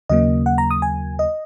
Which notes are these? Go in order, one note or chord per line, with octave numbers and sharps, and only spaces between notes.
D#2 C#3 F#3 A#3 D#5
F#5
A#5
D#6
G#5
D#5